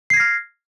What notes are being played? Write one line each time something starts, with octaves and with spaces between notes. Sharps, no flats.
F6 G#6 A#6 C7